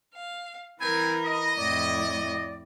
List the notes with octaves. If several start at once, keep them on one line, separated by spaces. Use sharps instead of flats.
F5
E3 G3 C4 A#4 G#5 B5
D#5
F2 A2 E4 D5